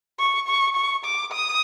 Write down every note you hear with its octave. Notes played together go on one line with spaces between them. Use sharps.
C#6
C#6
C#6
D6
D#6